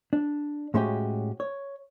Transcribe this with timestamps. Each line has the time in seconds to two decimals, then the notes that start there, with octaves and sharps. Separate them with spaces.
0.13 D4
0.74 A2 G#3 C#4 F#4 G4
1.40 C#5